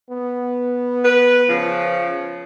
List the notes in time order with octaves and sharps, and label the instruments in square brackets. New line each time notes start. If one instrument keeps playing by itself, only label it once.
[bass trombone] B3
[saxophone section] B4
C#3 F3